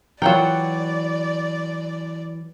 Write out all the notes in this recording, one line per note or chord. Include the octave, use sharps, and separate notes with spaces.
E3 F#3 F4 A#4 D5 F#5 G5